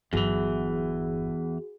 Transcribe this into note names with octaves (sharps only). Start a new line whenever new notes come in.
G1 E2 E3 F#3 F#4 G#4